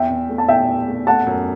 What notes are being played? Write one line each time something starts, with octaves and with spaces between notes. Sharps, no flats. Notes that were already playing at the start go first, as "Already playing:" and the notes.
Already playing: E2 E5 G5
E2
A3
A5
E2 E5 G5
E2
A3
A3 F#5 A5
F#2